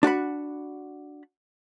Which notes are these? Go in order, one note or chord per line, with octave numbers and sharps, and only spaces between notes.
D4 F#4 F#5 B5